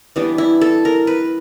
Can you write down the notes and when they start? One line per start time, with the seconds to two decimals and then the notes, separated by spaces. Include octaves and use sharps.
0.16 E3 G3 B3 D4
0.38 E4
0.61 A4
0.85 A#4
1.07 B4